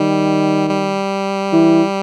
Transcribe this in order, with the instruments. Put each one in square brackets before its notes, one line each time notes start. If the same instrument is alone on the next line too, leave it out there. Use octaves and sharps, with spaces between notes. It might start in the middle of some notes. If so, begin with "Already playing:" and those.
Already playing: [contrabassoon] D#3 [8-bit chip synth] G3
[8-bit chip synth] G3
[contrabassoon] E3